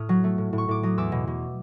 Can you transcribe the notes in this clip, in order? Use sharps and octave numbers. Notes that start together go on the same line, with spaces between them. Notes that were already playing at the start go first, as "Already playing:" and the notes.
Already playing: A2 D#6 F6
F#3
A3
A2
A2
C#6
A2 D6
F#3 D#6
E2 D6 E6
B2
B2